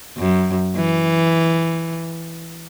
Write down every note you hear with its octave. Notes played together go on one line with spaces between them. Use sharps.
F#2
E3